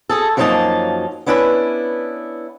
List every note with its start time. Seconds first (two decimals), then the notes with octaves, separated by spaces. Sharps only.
0.09 F#4 G#4 A4
0.37 F#2 F3 F#3 A#3 D#4 A5
1.26 B3 C#4 D4 E4 A#4 B4